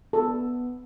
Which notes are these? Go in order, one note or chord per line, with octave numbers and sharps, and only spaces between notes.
B3 A4